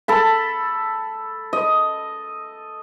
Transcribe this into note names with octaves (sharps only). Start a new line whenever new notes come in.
A4 A5 B5
D#5